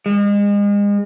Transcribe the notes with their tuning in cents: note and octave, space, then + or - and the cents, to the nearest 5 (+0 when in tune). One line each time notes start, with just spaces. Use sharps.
G#3 -35